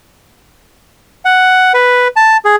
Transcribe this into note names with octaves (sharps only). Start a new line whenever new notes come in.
F#5
B4
A5
G#4